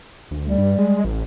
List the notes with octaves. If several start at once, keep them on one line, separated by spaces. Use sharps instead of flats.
D2
G3
G2
G#3
A1